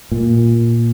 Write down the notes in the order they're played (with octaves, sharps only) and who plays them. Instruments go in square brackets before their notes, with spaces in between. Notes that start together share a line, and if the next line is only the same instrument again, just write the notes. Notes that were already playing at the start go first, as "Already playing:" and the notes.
[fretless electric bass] A#2